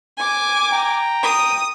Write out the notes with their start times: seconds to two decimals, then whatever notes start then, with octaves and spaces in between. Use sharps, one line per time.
0.17 G#5 D6
0.72 G5 A#5
1.23 D#6